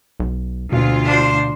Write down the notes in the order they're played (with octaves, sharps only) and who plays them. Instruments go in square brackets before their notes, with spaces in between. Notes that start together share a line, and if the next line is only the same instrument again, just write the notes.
[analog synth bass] B1
[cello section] D2 F4 [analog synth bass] B2
[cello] D4 C5